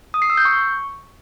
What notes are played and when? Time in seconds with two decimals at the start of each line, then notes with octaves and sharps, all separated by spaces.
0.14 D#6
0.22 C7
0.30 E6
0.37 G6
0.45 C#6